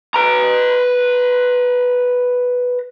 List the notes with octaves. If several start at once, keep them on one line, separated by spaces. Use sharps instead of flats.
B4 A#5